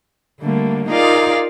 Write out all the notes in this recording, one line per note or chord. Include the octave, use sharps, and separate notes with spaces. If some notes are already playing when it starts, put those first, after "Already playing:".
D3 G3 A3 A#3
D#4 F4 G#4 A#4 D5 F5